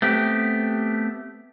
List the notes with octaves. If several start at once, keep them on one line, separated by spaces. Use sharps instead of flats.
A3 B3 C4 G4